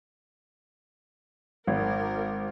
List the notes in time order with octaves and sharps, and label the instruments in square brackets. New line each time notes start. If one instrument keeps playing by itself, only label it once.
[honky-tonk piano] G#1 [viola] A#4